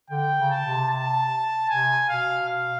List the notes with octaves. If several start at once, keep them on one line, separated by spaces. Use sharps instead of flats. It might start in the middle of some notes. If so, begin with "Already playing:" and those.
D3 G5
C#3
A5
C3
A5
C3 G#5
B2 F5
F5